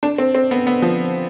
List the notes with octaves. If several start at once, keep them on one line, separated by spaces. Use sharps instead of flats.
D4
C4
C4
B3
B3
F3